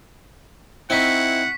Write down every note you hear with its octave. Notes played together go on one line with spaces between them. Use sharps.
C4 D#4 E4 F#5 C#6 B6 C#7